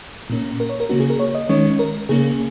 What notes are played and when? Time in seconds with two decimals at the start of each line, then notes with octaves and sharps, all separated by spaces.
0.30 A#2 A#3 C#4
0.60 A#4
0.69 C#5
0.80 A#4
0.89 C#3 A#3 C#4 F#4
1.00 G#4
1.10 A#4
1.20 C#5
1.35 D#5
1.49 D#3 G#3 C#4 C#5
1.79 A#4
2.09 C#3 A#3 C#4 G#4